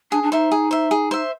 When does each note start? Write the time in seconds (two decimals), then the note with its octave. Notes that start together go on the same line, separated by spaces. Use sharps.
0.11 D4 G#4
0.23 D4
0.32 D#4 C5 E5
0.51 G#4
0.71 C5 E5
0.91 G#4
1.11 C5 E5